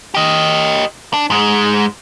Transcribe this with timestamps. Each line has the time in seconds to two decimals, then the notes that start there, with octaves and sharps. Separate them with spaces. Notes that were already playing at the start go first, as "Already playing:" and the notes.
0.15 G4 D#5
1.14 D4
1.30 G#2 G#3